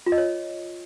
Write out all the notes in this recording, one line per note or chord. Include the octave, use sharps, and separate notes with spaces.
F4
D#5
C#5